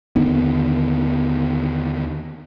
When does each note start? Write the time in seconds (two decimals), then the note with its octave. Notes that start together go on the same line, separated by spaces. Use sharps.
0.16 D#2 D3 D#3 B3